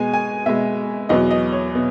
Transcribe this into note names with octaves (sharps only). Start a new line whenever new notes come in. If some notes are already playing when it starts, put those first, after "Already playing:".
Already playing: B2 G#3 G#5
G#5
B2 G#3 E5
E2 B2 F#3 D#5
D#5
C#5
B2